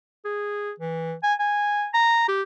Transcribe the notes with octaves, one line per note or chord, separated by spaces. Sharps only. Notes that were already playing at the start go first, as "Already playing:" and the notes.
G#4
E3
G#5
G#5
A#5
G4